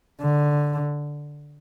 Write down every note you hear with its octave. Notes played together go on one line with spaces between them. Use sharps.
D3